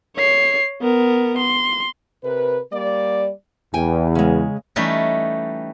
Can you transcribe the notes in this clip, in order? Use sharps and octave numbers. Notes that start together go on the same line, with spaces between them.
C#5 C7
B3 A#4
C6
C3 A#4 B4
G3 A#3 D5
E2 G5 G#5
C#3 G#3
E3 G3 A3 C#4 D#4